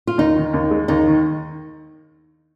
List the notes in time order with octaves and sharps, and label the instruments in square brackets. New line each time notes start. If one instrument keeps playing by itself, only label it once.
[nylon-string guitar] F4
[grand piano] D#2 [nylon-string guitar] D#4
[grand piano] D#3
D#2
G#3
[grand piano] D#2 [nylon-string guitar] D#4
[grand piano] D#3